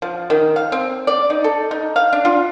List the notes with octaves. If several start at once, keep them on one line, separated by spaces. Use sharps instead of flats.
F3
D#3
F5
C4
D5
D#4
A4
D#4
F5
D4
F4